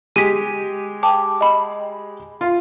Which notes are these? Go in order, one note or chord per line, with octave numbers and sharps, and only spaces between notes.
G#3 G4 B6 D#7
G5 A5 D6
D#5 B5
F4